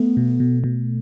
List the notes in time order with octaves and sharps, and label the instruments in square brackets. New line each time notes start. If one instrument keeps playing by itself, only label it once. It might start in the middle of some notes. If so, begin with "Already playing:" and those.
Already playing: [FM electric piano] A3 [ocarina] B3
[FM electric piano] B2
B2
B2